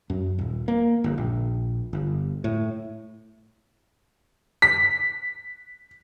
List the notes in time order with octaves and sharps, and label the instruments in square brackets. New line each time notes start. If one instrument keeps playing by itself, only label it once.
[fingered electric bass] F#2
D#1
A#3
G1
A#1
G1
A2
[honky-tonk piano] B6